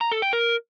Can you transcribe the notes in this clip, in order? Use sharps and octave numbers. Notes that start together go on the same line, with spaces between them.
A#5
A4
G5
A#4